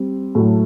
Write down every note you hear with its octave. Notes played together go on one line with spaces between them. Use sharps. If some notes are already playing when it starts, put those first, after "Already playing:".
Already playing: G3 C4
A2 F#3 A3